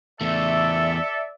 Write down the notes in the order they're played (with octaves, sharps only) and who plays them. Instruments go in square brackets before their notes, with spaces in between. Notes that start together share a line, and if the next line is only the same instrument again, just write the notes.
[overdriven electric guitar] E2 A3 [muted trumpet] A4 [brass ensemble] D5 E5